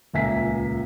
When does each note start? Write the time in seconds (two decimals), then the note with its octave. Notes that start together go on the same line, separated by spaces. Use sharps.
0.13 D#1 C#2 A#3 E5 G#5 B6